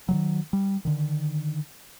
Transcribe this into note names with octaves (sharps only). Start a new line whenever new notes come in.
D#3 E3 F#3
G3
D3 D#3